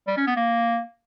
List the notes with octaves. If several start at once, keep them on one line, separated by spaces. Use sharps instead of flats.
G3
C#4
B3
A#3